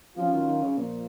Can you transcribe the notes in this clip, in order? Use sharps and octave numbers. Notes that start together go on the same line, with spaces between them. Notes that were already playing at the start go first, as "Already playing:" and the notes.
F3 F#3 C#4 F4
D#3
D#3
C#3
A#2 F3